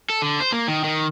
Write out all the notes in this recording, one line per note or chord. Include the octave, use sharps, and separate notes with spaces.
A4
D3
C5
A#3
D#3
D#3